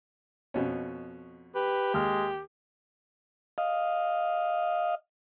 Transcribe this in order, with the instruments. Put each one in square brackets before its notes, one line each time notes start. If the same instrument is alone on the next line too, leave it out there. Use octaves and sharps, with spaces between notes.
[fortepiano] F2 B2 C#4
[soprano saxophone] G4 [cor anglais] B4
[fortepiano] D#2 F6 [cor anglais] G#3
[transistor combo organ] D#5 F5